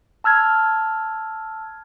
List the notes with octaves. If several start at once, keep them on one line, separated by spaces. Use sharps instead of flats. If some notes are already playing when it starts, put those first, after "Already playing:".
A5 E6 F6 G#6